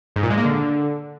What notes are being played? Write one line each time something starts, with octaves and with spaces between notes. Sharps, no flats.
G#2
A#2
G#3
A#3
D3